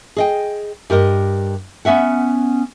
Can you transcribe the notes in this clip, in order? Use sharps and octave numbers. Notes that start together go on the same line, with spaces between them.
G#4 D#5 G5
G2 G4 A#4 D#5
B3 C#4 E5 F#5